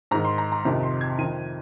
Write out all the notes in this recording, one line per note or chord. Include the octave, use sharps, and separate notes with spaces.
G#2 D#3 A#5
C6
A#5
A#5
F2 C3 D#3
C6
G#6
F2 D#3 D#7